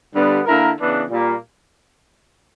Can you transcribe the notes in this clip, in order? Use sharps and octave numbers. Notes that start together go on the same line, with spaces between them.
G2 D3 G3 B3
D3 A#3 E4 A#4
C#3 E3 B3 D4
A#2 G3 A#3